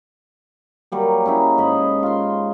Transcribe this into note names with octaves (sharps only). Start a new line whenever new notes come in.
F#3 G3 A#3
C#4 D#4 E4 G#4
G#2 G#4 D#5 B5
F4 C6